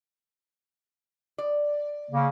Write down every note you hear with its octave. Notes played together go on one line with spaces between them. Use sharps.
D5
C#3 A#3